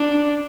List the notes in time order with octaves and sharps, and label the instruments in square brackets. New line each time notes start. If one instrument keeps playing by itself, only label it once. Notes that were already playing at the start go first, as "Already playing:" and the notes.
Already playing: [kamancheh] D4